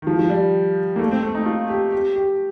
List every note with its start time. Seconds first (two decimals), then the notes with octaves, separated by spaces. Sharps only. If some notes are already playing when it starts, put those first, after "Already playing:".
0.02 D#3
0.07 F3
0.19 F3
0.30 G3
0.96 A#3
0.99 A3
1.11 C4
1.23 A3
1.35 D#4
1.46 F4
1.69 G4
1.92 G4
2.16 G4